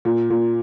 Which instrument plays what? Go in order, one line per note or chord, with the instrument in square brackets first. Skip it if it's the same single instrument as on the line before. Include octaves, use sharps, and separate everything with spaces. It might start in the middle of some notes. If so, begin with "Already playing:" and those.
[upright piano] A#2
A#2